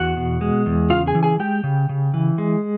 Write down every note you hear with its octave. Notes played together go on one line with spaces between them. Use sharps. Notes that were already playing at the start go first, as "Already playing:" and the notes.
Already playing: E2 F#4 F#5
B2
G#3
E2
C#3 F4 F5
G#4 G#5
E3
G#4 G#5
G#3 G4 G5
C#3
C#3
E3
G#3